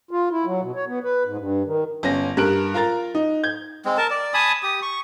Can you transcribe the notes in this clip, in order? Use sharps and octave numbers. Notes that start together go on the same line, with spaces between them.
F4
E4
F#3
B2
C#5
B3
B4
G#2
G2
D#3
G1 C#4 A#6
G2 A#4 F#6 D7
F4 A#4 A#5 A6
D#4
G6 G#6
G#3 C4
A#4 A5
D5
G#5 A5 B5 D#6
G4 D#6
C#6